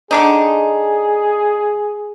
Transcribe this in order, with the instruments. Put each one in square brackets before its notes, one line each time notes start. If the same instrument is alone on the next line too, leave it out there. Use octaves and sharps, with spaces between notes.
[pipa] D3 D4 D#4 [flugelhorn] G#4